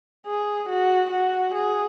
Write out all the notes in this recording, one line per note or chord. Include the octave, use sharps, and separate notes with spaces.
G#4
F#4
F#4
G#4